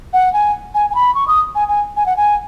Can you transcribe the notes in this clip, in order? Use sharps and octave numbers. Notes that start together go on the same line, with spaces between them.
F#5
G#5
G#5
G#5
B5
C#6
D#6
G#5
G#5
G#5
F#5
G#5